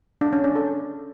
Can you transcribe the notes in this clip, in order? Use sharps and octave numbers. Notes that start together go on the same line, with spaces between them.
D4
C#4
D4
A4